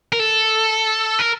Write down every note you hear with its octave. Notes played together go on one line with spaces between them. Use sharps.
A#4
A4
A#4